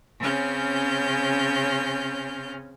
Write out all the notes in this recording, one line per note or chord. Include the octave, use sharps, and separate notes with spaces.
C#3 C4 C#4 F6 G6